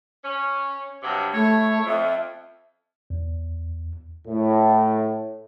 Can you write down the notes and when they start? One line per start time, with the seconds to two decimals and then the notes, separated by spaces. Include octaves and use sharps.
0.24 C#4
1.03 G2 C3 F#3
1.34 A3 E4 C#5
1.86 F2 E5
3.10 E2
4.27 A2